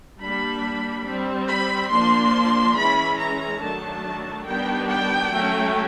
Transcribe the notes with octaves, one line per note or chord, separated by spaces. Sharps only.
G3 A#3 D4 B5
G3 C4
B5
F3 A#3 D4 C6
E3 G#3 C#4 B5
A#5
D#3 F#3 A3 D4 A5
D#3 G3 B3 D4 G5
G5
F#3 A3 C#4